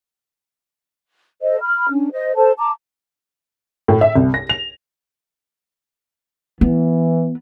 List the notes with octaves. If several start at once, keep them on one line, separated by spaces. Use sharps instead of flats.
A4 C5 D#5
B5 F6
C#4 D4
C5 D#5
A4 C5 A5
A5 A#5 D6
A2
E5
C2
A#6
F7
E3 B3